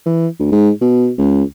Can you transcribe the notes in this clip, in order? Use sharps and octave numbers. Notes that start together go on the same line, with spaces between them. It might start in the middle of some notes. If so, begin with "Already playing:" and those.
E3
D2
G#2
B2
C#2